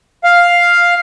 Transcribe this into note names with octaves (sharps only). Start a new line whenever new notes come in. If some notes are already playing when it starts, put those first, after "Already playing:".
F5